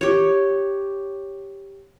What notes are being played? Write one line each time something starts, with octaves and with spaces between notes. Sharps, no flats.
G4 C#5